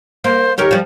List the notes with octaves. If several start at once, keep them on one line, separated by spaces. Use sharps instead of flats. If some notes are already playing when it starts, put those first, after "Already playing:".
A#3 C5
D#2 G4 A#4 C#5
F3 G3